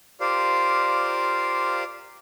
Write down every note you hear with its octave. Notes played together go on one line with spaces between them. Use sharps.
F4 G4 A#4 C5 D5 F5